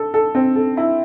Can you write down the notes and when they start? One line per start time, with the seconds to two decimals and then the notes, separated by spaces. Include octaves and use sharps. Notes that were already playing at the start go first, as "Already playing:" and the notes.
Already playing: A4
0.14 A4
0.35 C4
0.56 A4
0.77 E4